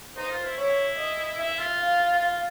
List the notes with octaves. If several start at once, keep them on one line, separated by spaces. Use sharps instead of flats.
D#4 C5
F4
E4
E4 C#5
D#5
E4 E5
F4
F5
F4